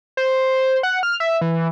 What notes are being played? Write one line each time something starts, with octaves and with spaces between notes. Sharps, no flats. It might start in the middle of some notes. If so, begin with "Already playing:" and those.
C5
F#5
F6
E5
E3